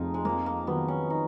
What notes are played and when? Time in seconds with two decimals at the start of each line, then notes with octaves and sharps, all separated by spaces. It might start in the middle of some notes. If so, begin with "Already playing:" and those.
Already playing: F1 F2 F3 D#4 F4 G#4
0.14 G#3
0.25 F2 A#3
0.46 A#3
0.67 D#3 F#3 B3
0.88 C#4
1.10 D#4